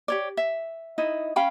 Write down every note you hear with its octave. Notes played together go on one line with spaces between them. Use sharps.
G4 C#5 D5
E5
D#4 E4 D#5
C#4 F5 G5 B5